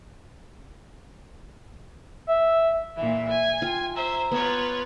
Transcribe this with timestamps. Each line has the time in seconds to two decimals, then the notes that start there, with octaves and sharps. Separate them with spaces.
2.28 E5
2.96 A#2 E3 E5
3.29 G#5
3.62 F4 G5
3.95 C5 E5 A#5
4.31 B3 F4 B4 C#5